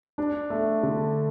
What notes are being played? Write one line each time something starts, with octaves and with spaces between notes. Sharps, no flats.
D4
A3
D3